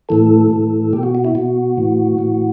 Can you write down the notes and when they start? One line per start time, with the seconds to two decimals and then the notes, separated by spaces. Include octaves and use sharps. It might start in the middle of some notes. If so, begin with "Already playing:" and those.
0.09 A2 E3 A4
0.51 A2 E3
0.93 B2 G4
1.03 F#4
1.15 F#4
1.25 E4
1.35 B2 F#4
1.77 A2 E3
2.18 A2 E3